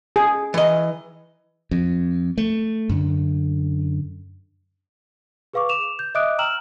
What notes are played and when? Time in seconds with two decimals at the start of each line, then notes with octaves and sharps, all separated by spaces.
0.16 G#4
0.54 E3 D#5
1.71 F2
2.38 A3
2.89 F#2 D3
5.53 G#4 B4 F5 C#6 D6
5.69 D6 E7 F7
5.99 G6
6.15 D#5 E5 D6 D#6 F#6 D7
6.38 G5 A#5 E6 F6 E7 F#7